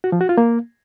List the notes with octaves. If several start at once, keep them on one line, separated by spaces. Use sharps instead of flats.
F#4
F3
F#4
F4
A#3